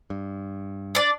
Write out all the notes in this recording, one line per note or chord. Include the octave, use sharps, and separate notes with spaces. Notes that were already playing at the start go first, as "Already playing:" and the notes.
G2
D4 D5